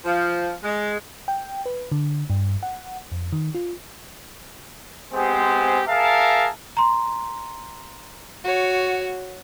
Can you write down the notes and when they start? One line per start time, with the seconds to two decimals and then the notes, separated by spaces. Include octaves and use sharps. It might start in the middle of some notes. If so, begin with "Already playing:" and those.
0.05 F3
0.63 G#3
1.28 G5
1.66 B4
1.92 D3
2.30 G2
2.63 F#5
3.12 F2
3.33 D#3
3.55 F4
5.13 G#3 B3 C4 G4 G#4 C5
5.87 G#4 A#4 E5 F5 A5
6.77 A#5 C6
8.44 F#4 C#5